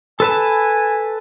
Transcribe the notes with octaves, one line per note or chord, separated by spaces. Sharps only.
A4 B4 G#5 A5